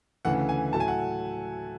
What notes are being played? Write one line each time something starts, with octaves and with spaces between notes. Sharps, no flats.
D2 C#3 E3 A3 F#5
G#5
A2 F#3 A3 A5
G#5
F#5